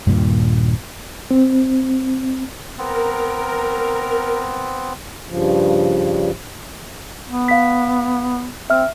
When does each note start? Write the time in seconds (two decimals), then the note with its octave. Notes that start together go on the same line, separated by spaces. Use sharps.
0.07 D#1 G2 A#2
1.31 C4
2.78 B3 C4 A#4
5.28 G2 C#3 F3
7.28 B3
7.48 F5 B6
8.70 C4 E5 F6